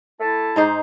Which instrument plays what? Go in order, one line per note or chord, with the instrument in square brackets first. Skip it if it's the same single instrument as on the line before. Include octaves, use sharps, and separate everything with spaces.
[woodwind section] A3 E4 A5
[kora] G#2 D#4 C5